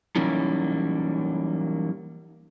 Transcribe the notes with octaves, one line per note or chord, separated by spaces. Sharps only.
E3 F#3 G3 A#3 C#4 D#4